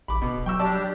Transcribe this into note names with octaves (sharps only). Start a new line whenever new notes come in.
A1 B5 D6
D1 B2 B3
F#3 G5 C#6 E6
G3 D4 G4 D5 A5 E6